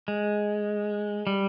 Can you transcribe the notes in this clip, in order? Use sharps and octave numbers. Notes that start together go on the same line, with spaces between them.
G#3
G3